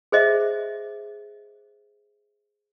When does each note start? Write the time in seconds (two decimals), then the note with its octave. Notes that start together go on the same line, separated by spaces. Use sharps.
0.12 G#4 C5 D#5 E5